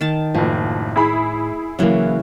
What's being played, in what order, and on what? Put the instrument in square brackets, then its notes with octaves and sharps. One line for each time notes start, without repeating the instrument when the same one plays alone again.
[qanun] D#3 A5
[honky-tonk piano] F#1 F3 [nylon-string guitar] A2
[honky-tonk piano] E4 G#4 B5
[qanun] C#3 E3 [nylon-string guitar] F#3 A#3